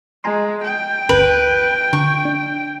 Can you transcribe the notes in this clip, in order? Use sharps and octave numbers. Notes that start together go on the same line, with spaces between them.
G#3 G#5 A#5 C6
G5
G1 D2 B4
D3 C#6
D4